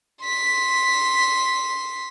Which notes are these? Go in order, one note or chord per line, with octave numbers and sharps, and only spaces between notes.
C6 B6